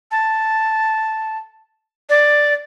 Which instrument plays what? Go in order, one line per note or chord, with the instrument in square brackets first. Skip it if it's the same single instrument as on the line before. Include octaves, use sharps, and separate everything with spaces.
[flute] A5
D5